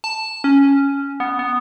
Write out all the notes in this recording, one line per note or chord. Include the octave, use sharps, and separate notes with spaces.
A5
C#4
B3
B3